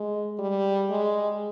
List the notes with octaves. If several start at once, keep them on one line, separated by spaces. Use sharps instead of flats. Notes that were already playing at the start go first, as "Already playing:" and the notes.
Already playing: G#3
G3
G#3